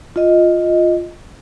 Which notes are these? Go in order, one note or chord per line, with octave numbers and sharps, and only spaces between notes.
F4 D#5